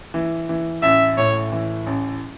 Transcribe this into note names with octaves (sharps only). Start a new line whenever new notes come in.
E3
E3
A1 E5
A2 C#5
E3
A1